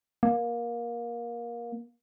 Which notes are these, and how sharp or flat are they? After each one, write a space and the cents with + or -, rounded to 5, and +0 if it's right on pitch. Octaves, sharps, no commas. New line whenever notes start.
A#3 +20